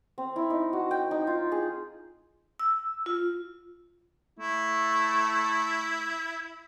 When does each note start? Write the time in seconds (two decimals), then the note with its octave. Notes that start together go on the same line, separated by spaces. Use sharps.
0.18 C4
0.36 E4
0.50 D#4
0.73 F#4
0.91 G5
1.11 D#4
1.27 F4
1.52 G#4
2.59 E6
3.06 F4
4.39 A3 E4